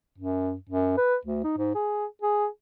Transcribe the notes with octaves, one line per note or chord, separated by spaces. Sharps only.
F#2
F#2
B4
D2
D#4
G#2
G#4
G#4